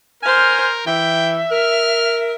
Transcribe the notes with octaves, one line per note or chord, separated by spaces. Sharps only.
A#4 C5 G#5 F6
E3 E5 G5
A#4 F6